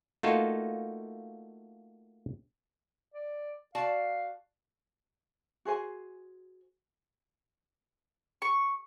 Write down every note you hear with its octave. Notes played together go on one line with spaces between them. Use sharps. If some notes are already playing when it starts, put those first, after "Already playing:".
A3 A#3 D#4 F4 F#4 A4
D5
F#4 D5 F5 A5
F#4 G#4 C5 G#5
C#6